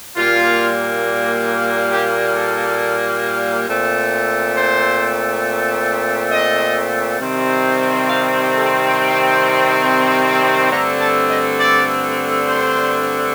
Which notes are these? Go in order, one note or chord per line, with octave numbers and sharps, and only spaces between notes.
A#2 G3 A#3 F4
G4
A4
A#2 A3 C4
C5
D#5
C3 D#3 G3 C4
F5
A4
G5
G2 D3 A3 C4 A#5
A5
D#5
D5
C5